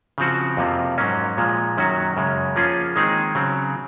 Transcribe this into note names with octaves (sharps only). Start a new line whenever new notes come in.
C#3 F3 C4 F#4
F2 C3 F3 A#3
G#2 F#3 A#3 C#4
A#2 F3 G#3
F#2 D#3 F#3 C#4 F#4
F#2 C#3 G#3
F3 A#3 C#4 F4 G#4
D#3 G#3 C4 D#4 G#4
C#3 F#3 C4